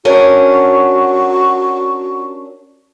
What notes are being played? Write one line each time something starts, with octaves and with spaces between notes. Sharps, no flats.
C#4 D4 F#4 A#4